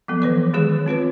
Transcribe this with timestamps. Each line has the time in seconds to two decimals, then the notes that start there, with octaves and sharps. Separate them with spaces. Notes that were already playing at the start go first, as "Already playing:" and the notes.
0.08 F3 F#3 B3 A4
0.22 E3 B4 D5
0.53 D#3 G#3 G4 G#4 C#5
0.86 C4 F4 B4 C#5